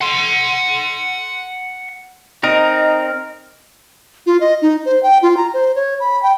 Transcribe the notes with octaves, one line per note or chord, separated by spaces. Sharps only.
F#5 C6
C4 D#4 A#4 D#5
F4
D#5
D#4
C5
G5
F4
A#5
C5
C#5
B5
G5